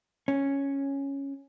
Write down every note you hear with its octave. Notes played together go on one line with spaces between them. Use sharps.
C#4